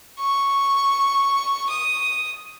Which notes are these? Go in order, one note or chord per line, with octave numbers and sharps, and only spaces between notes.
C#6
D#6